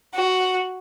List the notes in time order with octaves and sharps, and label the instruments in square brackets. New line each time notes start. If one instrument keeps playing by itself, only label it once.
[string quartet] F#4